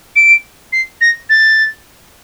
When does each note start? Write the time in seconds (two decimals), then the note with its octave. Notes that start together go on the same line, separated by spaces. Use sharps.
0.16 D7
0.73 C7
1.01 A#6
1.29 A6